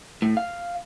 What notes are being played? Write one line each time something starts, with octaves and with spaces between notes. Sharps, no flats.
A2
F5